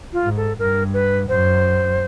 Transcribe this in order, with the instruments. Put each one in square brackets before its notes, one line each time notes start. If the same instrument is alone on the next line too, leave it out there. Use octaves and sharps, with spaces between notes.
[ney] F4
[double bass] G#2
[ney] A4
[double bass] G2 [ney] A#4
[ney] B4
[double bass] F#2 [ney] C5